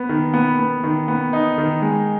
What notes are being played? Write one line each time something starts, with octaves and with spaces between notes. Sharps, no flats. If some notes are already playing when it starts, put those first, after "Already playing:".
Already playing: B3
D#3
B3
B3
D#3
B3
D#4
D#3
G#3